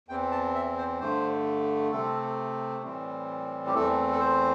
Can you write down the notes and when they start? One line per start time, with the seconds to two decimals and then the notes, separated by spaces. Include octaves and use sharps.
0.09 E2 E3 C4 G5
0.31 A5
0.55 E5
0.77 C5
1.00 G2 D3 A3 C5
1.92 C3 A3 C4 A4
2.83 A2 E3 G3 C4
3.67 G4
3.74 E2 E3 A3 C4 A4
4.12 A4
4.20 C5